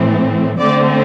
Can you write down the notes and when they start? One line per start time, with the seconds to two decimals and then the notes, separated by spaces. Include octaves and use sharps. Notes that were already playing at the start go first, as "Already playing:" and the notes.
Already playing: A2 E3 A3 C4
0.59 D3 A3 C4 D5